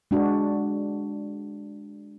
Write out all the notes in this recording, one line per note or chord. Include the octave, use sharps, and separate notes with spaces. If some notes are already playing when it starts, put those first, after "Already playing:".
G#3 D4 F#4